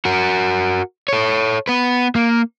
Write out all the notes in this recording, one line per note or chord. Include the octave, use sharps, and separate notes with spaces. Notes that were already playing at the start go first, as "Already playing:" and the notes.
F#4 A#4
A4 C#5
B3 B4
A#3